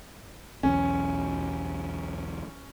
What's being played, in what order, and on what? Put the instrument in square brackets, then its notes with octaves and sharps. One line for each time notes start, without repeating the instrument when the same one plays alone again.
[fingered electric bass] B1 E2 [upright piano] C#4